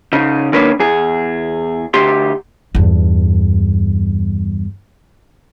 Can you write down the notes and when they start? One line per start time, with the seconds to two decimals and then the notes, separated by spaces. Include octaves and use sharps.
0.13 C#3 D#4
0.53 D#3 A#3 C#4 D4 B4
0.79 E2 G#4
1.94 D2 G4 C6
2.75 E2 G2